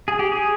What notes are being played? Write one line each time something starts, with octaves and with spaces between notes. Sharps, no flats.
G#4
G4
G#4